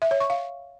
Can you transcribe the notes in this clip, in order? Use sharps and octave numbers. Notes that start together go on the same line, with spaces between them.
E5
C#5
C#6
F5